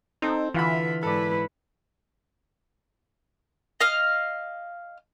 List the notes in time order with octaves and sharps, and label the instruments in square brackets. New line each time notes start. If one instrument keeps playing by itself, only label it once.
[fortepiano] C4 A4 [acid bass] D#4
[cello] D3 E5 [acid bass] E3 [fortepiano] F4 F#5 B5
[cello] G#2 E4 [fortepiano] A4 D5 [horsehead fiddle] B4
[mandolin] D#5 F5 F6